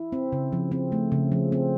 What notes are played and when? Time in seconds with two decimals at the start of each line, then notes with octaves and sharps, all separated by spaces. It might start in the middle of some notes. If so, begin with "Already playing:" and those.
Already playing: E4
0.12 C4
0.32 C#3
0.52 F3
0.72 C4
0.92 A3
1.12 C#3
1.32 F3
1.52 C4